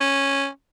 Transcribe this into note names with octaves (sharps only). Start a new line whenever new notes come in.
C#4